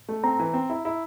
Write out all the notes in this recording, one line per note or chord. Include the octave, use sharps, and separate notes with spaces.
A3
C4 A#5
E3
C4
E4
E4